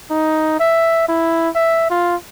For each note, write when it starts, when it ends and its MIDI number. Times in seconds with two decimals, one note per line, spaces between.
0.11 0.58 63
0.60 1.08 76
1.09 1.49 64
1.55 1.86 76
1.91 2.16 65